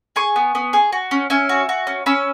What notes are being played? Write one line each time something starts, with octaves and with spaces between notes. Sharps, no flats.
G#4 G#5 C#6
B3
B3
G#4
F#4
C#4
C#4 E5 G#5
F#4
F#4
C#4
C#4 B5 E6